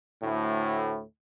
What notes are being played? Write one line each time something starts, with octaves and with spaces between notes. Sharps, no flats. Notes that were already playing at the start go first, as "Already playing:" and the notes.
D2 A2